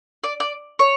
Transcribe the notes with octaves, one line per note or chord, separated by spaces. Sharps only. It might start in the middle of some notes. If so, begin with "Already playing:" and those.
D5
D5
C#5